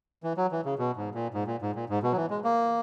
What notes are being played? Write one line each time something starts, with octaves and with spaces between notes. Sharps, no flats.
E3
F#3
E3
C#3
B2
G#2
A#2
G#2
A#2
G#2
A#2
G#2
B2
F#3
E3
G#3
A#3